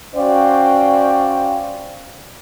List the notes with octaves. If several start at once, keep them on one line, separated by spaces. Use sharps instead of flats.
C#4 F#4 C5 D5 F5 G5